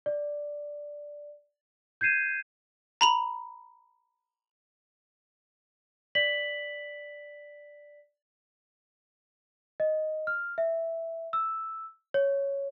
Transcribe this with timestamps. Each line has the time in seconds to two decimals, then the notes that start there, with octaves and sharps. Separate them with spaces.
0.06 D5
2.01 G6 G#6 C7 D#7 E7
3.01 A#5 B5 F7
6.15 D5 B6 F#7
9.80 D#5
10.27 F6
10.58 E5
11.33 E6
12.14 C#5